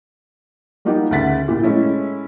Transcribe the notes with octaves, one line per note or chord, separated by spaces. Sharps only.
G3 A#3 D#4 F4 G4 F#5
D2 C#3 F#5 A6 B6
A#2 E4 F4 G4
G#3 A3 C#4 E4